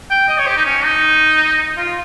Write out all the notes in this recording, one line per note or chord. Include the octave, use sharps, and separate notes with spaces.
G5
D#5
C#5
G4
D#4
C#4
D#4
F4